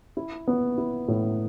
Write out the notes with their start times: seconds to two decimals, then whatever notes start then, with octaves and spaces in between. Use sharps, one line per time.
0.17 E4
0.47 B3
0.78 E4
1.08 A2